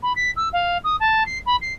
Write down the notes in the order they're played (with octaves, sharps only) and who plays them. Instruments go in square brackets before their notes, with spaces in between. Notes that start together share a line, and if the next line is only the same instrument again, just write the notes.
[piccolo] B5
B6
E6
F5
D#6
A5
C7
B5
C7